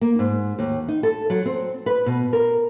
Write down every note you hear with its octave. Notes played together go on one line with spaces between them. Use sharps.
A#3
G#2
D#2
D#4
A4
F#3
C4
B4
B2
A#4